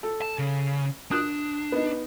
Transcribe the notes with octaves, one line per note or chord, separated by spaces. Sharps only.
A4
A5
C#3
D4 D#6 F#6
B3 D#4